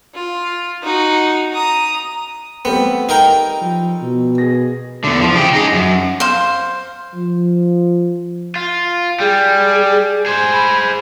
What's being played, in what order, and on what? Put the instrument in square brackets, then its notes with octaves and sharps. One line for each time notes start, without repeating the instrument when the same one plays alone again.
[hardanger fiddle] F4
D#4 F#4
A#5 D#6
[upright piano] G3 A3 C4 [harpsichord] B3
[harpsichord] D#4 A#4 G5
[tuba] F3
B2
[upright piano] G#4 A#6
[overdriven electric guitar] E2 D3
F3
C#3 G4
D#4 G#4
F#2
[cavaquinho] C5 F5
[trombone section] F3
[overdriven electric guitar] F4
[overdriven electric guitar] G3 [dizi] G#4
[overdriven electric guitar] G#4 C5 [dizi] G#5
[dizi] B5